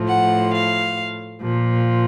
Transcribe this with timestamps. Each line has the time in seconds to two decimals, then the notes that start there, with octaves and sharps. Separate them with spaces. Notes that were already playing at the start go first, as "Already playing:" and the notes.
Already playing: A2 F3
0.08 F#5
0.54 F5
1.41 A#2 F3